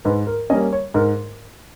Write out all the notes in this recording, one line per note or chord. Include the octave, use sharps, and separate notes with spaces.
G#2 B4
A#4
G3 A#3 C#4 D#5
C#5
G#2 A#4